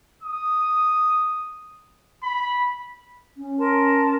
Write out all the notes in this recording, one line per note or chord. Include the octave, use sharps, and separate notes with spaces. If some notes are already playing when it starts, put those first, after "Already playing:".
D#6
B5
C#4
A#4 A5 C6